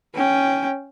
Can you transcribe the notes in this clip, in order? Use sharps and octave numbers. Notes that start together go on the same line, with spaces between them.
C#4 G5